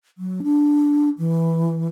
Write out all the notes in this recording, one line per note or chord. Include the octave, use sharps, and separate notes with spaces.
F#3
D4
E3